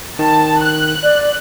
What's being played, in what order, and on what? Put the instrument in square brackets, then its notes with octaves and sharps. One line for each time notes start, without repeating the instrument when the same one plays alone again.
[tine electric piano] D#3 [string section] A5
[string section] F#6
[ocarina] D5